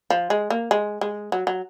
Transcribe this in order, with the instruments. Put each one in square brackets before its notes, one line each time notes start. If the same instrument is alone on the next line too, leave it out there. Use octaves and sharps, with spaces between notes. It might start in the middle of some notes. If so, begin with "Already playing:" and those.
[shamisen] F3
G#3
A#3
G#3
G#3
F#3
F#3